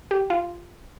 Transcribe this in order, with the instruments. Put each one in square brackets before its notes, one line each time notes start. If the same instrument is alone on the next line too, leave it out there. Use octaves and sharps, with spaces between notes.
[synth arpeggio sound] G4
F4